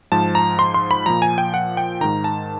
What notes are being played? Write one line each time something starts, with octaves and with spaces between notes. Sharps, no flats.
G#2 F3 A5
A#5
C6
C6
B5
A#2 F3 A#5
G#5
G5
F#5
G5
G#2 D#3 A#5
A5